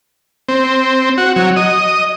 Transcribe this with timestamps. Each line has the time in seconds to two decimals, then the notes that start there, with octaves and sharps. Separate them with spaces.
0.49 C4
1.18 F#4
1.36 F#3
1.56 D#5